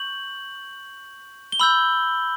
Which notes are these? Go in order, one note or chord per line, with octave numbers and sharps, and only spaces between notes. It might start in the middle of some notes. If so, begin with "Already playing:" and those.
Already playing: C#6 G6 F#7
G7
B5 E6 G6 F#7